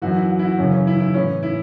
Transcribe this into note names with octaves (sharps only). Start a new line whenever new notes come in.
F#2 E3 F#4
E4
F#4
E4
F#4
F#2 C#3 E3 C#4
C#4
E4
E4
A2 E3 C#4
E4